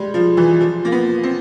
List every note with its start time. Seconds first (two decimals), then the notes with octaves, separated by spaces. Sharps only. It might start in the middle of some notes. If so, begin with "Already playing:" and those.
Already playing: G3 G#3
0.14 F3
0.37 E3
0.61 F3
0.85 A#3
0.92 B3
1.23 C4